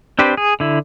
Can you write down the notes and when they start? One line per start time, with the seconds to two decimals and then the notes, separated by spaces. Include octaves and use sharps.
0.19 C4 D4 G4 B4 C5
0.37 G#4
0.60 D3 E4